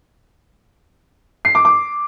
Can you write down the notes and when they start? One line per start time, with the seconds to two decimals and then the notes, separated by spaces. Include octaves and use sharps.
1.45 C7
1.55 D6
1.65 D6